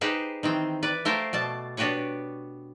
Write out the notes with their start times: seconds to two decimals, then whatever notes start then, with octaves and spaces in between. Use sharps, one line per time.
0.01 D#4 G4 G#4 B4 C5
0.43 D#3 E3 C4
0.83 B4 D5
1.05 A3 G4 A#4 C5 F5
1.33 B2 D5 A5
1.77 B3 D4 F#4 G4 B4 C#5